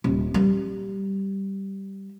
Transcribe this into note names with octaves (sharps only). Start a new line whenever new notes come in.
D#1
G3